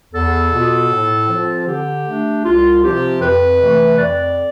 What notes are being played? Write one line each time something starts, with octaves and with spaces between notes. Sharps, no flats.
E2 A4
B2 B3 F4
A2
F3 C4 F4
D3 G4
A3 D4
C2 F4
C3 F3 C4 F4 G4
F2 B4
C3 E3 A3
F2 D5